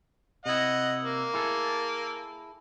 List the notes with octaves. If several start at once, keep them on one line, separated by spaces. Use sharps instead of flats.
C3 E4 D#5 F#5
A#3
E4 G#4 A4